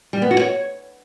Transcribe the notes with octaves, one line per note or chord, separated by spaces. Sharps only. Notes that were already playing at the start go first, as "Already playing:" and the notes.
G3
B3
F#4
C#5